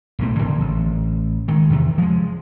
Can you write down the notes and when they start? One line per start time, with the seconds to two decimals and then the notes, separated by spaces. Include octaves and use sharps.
0.19 B1 A2 C4
0.38 E1 A#1 D3
0.61 A1
1.48 D#3 G#3
1.70 E2 C3
1.98 F3 G#3